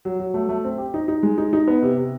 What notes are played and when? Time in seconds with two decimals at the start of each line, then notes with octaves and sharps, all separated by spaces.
0.05 F#3
0.20 F#3
0.34 A3
0.49 A3
0.64 C4
0.78 G4
0.94 D#4
1.08 D#4
1.23 G#3
1.38 D#4
1.53 D#4
1.67 B3
1.82 C3
1.97 C3